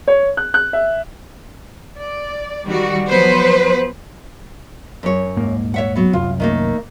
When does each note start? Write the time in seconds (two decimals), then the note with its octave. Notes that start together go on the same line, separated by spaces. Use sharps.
0.08 C#5
0.37 F#6
0.54 F#6
0.73 E5
1.98 D5
2.65 D#3 G3 F#4
3.08 F3 F#3 B3 B4 C5
5.03 F#2 C#5
5.36 D#1 G#2 A#3
5.74 C#5 E5 F#5
5.96 F#3 B3
6.13 C2 F#2 F4
6.40 D#3 A3 A#3